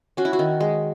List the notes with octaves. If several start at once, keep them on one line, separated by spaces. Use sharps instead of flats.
C#4 F#4
E4
F#4
D#3
G#3